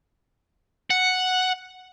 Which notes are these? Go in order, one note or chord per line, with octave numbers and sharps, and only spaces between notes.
F#5